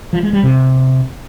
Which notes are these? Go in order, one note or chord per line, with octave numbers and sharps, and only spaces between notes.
F3
G#3
G3
C3